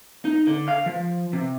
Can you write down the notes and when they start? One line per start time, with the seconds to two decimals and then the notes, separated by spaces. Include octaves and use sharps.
0.25 D#4
0.47 D3
0.68 F5
0.86 F3
1.33 C3